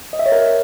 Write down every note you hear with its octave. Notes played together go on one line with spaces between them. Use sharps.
D#5
E5
C#5
A#4